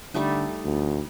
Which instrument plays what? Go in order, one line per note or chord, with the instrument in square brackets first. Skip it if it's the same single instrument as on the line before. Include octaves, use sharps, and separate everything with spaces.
[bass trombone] D3 [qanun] G3 A3 D#4
[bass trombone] D2